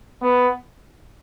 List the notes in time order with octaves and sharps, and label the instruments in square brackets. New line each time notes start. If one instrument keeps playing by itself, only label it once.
[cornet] B3